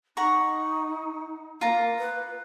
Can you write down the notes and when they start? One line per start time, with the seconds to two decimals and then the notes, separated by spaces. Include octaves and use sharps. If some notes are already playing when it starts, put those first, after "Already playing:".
0.17 D#4 F#5 A#5 C#6
1.61 A#3 F4 A#5
1.99 B4